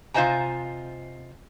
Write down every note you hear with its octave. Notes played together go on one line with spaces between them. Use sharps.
C3 F4 C5 D#5 G#5 A#5